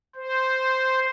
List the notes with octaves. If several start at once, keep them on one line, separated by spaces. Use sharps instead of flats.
C5